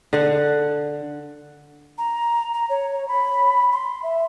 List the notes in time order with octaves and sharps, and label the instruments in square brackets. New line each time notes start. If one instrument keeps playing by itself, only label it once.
[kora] D3 F#5
[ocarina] A#5
A#5
C#5
B5
C6
E5